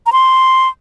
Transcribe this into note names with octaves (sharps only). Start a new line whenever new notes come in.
A#5
C6